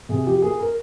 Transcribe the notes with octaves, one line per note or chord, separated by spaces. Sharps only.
C3 G#4
F3 G4
A#3 G#4
A#4